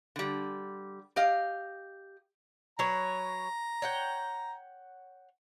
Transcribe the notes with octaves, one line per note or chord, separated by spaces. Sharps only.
D3 G3
G4 D#5 F5
F#3 B4 C#5 A#5
C#5 F#5 G5